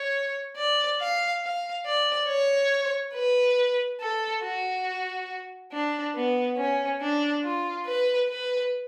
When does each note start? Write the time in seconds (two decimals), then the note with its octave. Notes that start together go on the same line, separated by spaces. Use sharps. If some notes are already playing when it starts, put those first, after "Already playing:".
Already playing: C#5
0.57 D5
1.00 F5
1.43 F5
1.86 D5
2.28 C#5
3.14 B4
4.01 A4
4.43 F#4
5.73 D4
6.15 B3
6.58 C#4
7.01 D4
7.44 F4
7.87 B4
8.29 B4